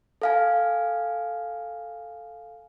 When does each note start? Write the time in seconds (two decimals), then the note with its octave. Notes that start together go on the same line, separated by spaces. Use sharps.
0.22 A4 F5 G#5